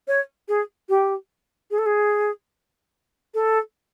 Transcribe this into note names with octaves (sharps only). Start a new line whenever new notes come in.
C#5
G#4
G4
G#4
A4
G#4
A4